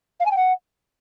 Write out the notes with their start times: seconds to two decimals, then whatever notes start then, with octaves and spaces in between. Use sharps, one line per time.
0.20 F5
0.25 G#5
0.31 G5
0.36 F#5